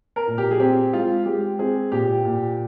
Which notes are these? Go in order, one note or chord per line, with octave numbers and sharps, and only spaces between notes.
A#4
A#2
G4
G#4
C4 G4
G#3 F4
G#3 G4
C4 G#4
A#2 G4
A#2